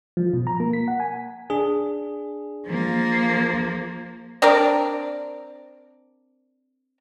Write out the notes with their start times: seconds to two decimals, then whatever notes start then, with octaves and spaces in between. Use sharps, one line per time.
0.17 F3
0.33 B2
0.47 A#5
0.60 A#3
0.73 B6
0.88 F#5
1.00 G#5
1.50 D4 G#4
2.66 F3 A#3
4.42 C4 D4 A#4 D5